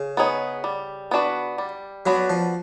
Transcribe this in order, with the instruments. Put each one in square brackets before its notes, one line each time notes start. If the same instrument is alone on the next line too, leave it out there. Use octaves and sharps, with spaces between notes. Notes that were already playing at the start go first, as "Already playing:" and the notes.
Already playing: [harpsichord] C#3
[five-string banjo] B3 D#4 G#4 C#5
G3
B3 D4 F#4 B4
G3
[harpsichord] F#3 [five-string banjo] B3 D4 F#4 B4
[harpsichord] F3